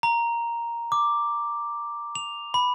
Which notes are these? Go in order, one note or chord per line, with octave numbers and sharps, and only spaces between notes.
A#5
D6
F7
B5